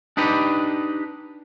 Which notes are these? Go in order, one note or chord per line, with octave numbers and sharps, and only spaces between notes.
D4 D#4 G4 B4